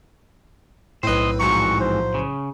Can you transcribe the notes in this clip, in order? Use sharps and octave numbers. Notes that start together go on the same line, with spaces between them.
B1 A2 C4 B4 C5 D#5
F2 G#2 E3 F3 F#4 A#5 C#6
C5
C#3